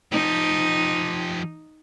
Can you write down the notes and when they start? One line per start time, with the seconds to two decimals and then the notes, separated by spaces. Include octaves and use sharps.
0.12 F3 D#4 G4